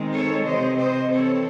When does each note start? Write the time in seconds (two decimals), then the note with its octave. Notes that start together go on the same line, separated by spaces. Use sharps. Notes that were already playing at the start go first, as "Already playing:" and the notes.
Already playing: D#3 G#3 C4
0.12 A4 C#5
0.45 C3 E3 C4 C5 D#5
0.78 C5 D#5
1.10 E3 C4 A4 C#5